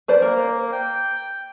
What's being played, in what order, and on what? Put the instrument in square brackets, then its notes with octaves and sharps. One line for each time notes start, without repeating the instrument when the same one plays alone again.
[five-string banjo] B4 C5 D5
[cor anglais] A#3 [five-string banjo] A#4
[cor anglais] G5